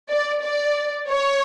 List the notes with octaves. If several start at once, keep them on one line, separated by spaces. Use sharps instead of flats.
D5
D5
C#5